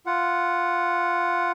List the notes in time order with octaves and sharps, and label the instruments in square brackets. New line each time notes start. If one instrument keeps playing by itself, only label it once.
[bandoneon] F4 F#5